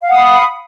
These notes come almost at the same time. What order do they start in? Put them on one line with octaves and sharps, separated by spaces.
F5 F#5 D#6 B5